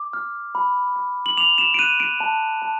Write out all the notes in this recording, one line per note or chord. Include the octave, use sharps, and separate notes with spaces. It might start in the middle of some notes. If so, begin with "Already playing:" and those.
Already playing: D6
F6
B5
B5
F#7
D6 F7
E7
D7
F#6 D#7
D7
A5
A5